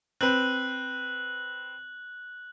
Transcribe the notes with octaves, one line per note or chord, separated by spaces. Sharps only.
C4 B4 F#6 F#7